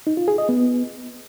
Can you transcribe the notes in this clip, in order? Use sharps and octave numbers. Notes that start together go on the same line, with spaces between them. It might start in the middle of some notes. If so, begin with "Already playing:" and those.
D#4
F4
G#4
D#5
B3